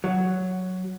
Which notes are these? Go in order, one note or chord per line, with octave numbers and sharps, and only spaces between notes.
F#3